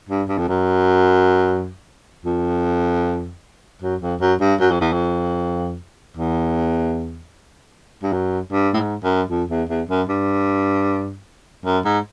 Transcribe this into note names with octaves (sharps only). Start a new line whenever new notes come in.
G2
G2
F2
F#2
F2
F#2
F2
F#2
G2
F#2
F2
E2
F2
E2
G2
F#2
G2
A2
G#2
F#2
F2
E2
E2
F#2
G2
F#2
G#2